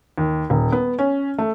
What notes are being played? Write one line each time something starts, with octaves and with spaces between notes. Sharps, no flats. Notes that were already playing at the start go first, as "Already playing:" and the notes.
D#2
D#1
B3
C#4
A3